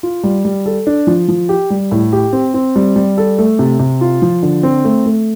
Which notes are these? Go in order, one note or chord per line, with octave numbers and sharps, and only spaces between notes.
F4
G3
G3
A4
D4
F3
F3
G4
G3
A2
G4
C4
C4
G3
G3
A4
A3
C3
C3
F4
F3
D3
C4
A3
A3